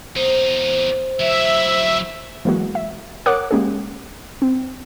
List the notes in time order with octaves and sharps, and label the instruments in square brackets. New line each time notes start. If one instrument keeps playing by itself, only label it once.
[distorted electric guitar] E2 D#4 [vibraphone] C5
[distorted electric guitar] F#3 E4 [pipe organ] E5
[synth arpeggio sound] E3 F#3 G#3 A#3 F#4
E5
A#4 C#5 F#5 D6 D#6 F#6
G#3 A#3 C#4 G4 G#4
C4